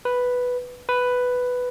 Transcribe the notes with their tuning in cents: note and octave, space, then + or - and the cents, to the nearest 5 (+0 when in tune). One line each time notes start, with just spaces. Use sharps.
B4 +0
B4 +5